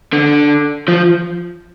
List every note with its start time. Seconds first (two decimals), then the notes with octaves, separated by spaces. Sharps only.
0.13 D3
0.88 F3